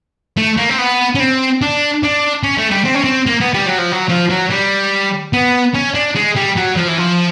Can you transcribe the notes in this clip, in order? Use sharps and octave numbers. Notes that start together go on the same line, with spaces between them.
A3
A#3
C4
B3
C#4
C4
D4
D4
C#4
A3
G3
C4
C#4
C4
A#3
B3
G3
F#3
F3
F#3
F3
F#3
G3
B3
C#4
D4
G#3
G3
F#3
F3
E3
F3